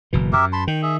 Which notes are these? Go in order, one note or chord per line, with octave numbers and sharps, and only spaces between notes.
F#1 B2 E3
F#2 G4 A#4 E5
A5 B5 C6
D#3 G5
G#4 E5